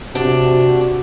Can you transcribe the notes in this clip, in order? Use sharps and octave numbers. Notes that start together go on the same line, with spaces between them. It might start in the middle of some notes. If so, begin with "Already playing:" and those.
C3 D4 F#4